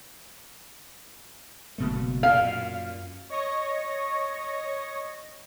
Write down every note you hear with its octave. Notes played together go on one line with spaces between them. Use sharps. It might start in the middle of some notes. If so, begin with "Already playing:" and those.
F#1 B2 A3
F#2 A#2 F5
C#5 D#5 C#6 A#6